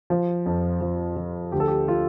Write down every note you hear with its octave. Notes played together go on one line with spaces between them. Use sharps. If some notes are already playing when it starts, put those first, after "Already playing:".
F3
F2
F3
F3
D2 G4
A4
G4
F3 F4